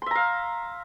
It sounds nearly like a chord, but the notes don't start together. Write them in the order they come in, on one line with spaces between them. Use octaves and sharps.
C6 E5 A#5 F5